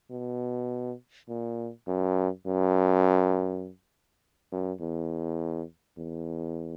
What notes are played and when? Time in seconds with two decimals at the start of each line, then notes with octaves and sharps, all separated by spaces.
0.11 B2
1.29 A#2
1.87 F#2
2.46 F#2
4.52 F#2
4.80 E2
5.98 E2